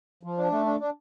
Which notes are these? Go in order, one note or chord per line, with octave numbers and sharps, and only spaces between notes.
F3
D4
A3
D4
D4